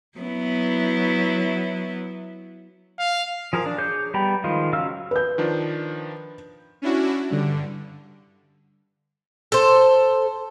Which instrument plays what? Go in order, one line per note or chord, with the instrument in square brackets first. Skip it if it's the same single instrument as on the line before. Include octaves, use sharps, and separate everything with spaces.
[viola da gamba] F#3 B3 E4
[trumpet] F5
[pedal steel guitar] F3 G#4 A#4
D4
G#4 C#5 D6 G6
G3 B3 G5 A#5 B5
D#3 F3 G#3 F4
C#3 F#3 F5 E6 F6
[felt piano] B4 G6
[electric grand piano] D#3 F3 D4
[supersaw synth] C#4 D4 E4 F#4
G2 D3
[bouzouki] A4 C5